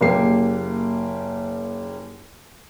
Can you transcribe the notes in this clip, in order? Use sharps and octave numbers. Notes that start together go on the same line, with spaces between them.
F#1 A#3 G4 C7